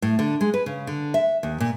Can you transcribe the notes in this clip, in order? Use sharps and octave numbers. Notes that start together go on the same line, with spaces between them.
A2
D3
G#3
B4
C#3
D3
E5
D#2
A#2